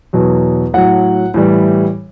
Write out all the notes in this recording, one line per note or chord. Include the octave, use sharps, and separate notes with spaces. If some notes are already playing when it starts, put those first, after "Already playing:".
E2 B2 F#3
A2 F#3 F#5
A2 E3 G3